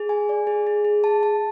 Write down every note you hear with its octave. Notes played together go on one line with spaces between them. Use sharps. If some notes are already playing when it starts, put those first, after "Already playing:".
Already playing: G#4
G#5
D5
G#4
G#4
G#4
A5
A5